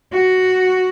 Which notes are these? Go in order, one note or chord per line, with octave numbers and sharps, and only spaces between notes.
F#4